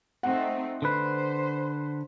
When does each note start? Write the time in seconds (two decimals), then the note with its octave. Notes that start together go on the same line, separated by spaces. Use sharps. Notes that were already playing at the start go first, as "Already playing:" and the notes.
0.23 A3 C4 D#4 F#5
0.82 D3 B4 C5